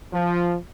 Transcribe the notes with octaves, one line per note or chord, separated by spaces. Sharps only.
F3